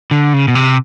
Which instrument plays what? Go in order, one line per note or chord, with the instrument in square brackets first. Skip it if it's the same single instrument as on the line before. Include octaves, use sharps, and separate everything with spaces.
[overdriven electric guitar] D3
C#3
B2
C3